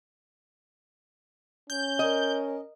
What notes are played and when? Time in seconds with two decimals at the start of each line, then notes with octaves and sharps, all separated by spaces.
1.70 C#4 G6
1.99 A#4 D#5